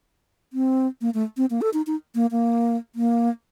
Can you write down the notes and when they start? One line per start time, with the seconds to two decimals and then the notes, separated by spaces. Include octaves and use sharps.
0.53 C4
1.01 A#3
1.14 A3
1.37 C4
1.50 A#3
1.61 A4
1.74 D#4
1.87 D#4
2.15 A#3
2.31 A#3
2.95 A#3